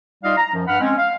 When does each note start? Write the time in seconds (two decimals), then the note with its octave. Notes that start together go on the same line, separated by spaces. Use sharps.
0.24 G3 D#4 F4 D#5 F5
0.37 A#5
0.53 F#2 F3
0.68 G2 F#5 B5 F6
0.81 G#3 C4 C#4
0.98 F5